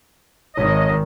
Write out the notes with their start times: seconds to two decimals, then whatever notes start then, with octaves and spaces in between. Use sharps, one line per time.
0.56 G#1 D#3 C#5 D#5